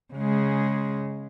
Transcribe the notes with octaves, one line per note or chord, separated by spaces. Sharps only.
C#3 G#3